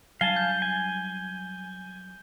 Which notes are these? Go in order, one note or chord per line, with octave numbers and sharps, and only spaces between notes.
F#3 G3 D4 F5 G#5 A5 G7
G6
G#5